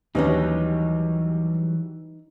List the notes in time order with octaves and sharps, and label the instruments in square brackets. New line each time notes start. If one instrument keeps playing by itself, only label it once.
[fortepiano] D#2 C#4 [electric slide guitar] E3 F#3 G3 [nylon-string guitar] D#4 B4 D#5